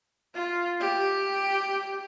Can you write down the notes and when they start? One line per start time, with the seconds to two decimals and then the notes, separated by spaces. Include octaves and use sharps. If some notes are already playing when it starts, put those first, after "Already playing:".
0.35 F4
0.80 G4